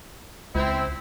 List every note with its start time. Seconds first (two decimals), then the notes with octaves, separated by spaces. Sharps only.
0.55 C#2 C4 E4